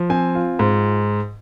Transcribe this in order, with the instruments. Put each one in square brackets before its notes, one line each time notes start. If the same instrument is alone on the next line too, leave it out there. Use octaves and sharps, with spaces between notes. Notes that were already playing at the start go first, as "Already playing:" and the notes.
Already playing: [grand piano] F3
C4 G#5
F4
G#2